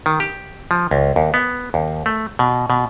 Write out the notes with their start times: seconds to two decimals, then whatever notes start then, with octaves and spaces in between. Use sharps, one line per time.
0.06 D#3
0.20 G4
0.71 F3
0.91 C#2
1.16 D#2
1.34 B3
1.74 D#2
2.06 A3
2.39 B2
2.70 B2